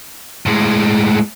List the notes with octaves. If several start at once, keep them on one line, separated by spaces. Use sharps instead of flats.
A2 G#3